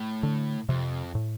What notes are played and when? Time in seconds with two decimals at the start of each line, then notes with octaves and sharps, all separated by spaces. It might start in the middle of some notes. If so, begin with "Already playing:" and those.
Already playing: A2
0.23 D3
0.69 F2 C3
1.15 A2